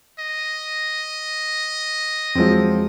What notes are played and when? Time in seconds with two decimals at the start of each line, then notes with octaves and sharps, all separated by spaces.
0.19 D#5
2.35 F2 F3 F#3 G#3 C4